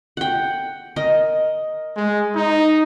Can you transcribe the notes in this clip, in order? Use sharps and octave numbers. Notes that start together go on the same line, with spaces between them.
F#5 G5
A#4 D#5
G#3
D#4